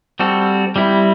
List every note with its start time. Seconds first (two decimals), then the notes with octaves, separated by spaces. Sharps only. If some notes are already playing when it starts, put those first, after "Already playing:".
0.20 G3 C4 F#4 A4
0.76 G3 C4 E4